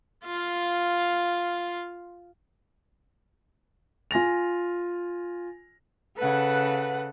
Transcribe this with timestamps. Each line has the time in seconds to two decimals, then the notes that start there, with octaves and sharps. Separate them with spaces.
0.25 F4 F5
4.11 F4 G#5 A#6 F7
6.17 C#3 A4 B4 F#5